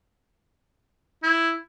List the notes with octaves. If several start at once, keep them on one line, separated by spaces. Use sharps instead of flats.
E4